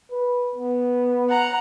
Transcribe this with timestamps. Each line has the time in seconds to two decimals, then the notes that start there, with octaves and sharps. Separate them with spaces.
0.11 B4
0.55 B3
1.29 F#5 A#5